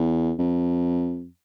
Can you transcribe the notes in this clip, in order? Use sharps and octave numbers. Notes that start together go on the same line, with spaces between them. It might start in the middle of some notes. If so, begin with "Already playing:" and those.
Already playing: E2
F2